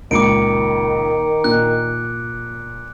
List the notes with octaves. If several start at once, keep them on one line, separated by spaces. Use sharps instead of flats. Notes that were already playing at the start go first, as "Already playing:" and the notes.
C#2 A#2 D#3 D6 C#7 D7
A#2 F#6